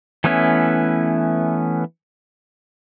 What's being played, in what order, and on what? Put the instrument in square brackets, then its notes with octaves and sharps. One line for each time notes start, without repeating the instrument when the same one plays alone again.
[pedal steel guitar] E3 A3 B3 C#4 E4